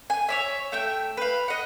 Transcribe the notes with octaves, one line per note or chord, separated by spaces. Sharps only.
G#5
C#5 D5 E5
A3 E5 G5
B4 F5
D#5 F#5